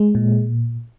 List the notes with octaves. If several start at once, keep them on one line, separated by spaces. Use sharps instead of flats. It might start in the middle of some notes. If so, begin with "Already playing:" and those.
Already playing: G#3
A#2